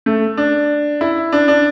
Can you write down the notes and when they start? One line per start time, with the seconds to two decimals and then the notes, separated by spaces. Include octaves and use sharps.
0.06 A3
0.37 D4
1.01 E4
1.33 D4
1.48 D4